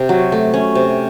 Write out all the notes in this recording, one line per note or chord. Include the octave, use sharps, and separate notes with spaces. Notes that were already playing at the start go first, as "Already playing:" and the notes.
Already playing: C3
F#3
A3
C#4
C3